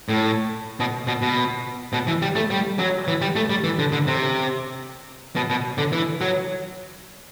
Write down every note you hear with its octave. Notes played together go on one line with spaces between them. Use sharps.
A2
B2
B2
B2
B2
E3
G3
A3
G3
F#3
E3
G3
A3
G3
E3
D3
D3
C3
B2
B2
D3
E3
F#3